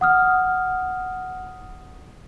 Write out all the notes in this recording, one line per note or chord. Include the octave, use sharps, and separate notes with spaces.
F#5 D#6 F6